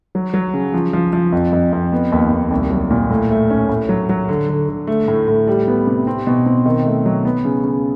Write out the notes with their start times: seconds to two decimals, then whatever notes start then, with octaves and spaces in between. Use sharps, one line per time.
0.15 F#3
0.34 F#3
0.54 C#3
0.74 F3
0.93 F3
1.13 F3
1.32 F2
1.53 F2
1.73 F2
1.92 B3
2.12 D#2
2.31 D#2
2.51 C2
2.71 F#3
2.91 A#2
3.10 A2
3.30 A3
3.50 C#4
3.69 A2
3.89 F#3
4.09 F#3
4.29 D3
4.49 D3
4.69 D3
4.87 A3
5.08 A2
5.28 A2
5.47 G3
5.68 B3
5.87 C3
6.07 C4
6.27 B2
6.46 C4
6.65 D#3
6.86 A3
7.06 F#3
7.25 B3
7.45 C#3
7.64 C#3